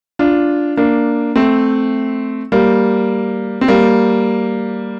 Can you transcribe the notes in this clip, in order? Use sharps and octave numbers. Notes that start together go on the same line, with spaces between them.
D4 F4
A#3 D4
A3 C4
G3 A#3
C4
G3 A#3